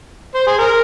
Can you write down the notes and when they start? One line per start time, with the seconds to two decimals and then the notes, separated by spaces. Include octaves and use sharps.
0.35 C5
0.47 G#4
0.58 A#4